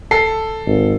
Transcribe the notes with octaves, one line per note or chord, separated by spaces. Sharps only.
A4 C7
G#1